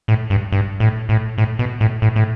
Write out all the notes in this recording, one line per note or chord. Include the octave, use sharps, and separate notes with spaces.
A2
G2
G2
A2
A2
A2
B2
A2
A2
A2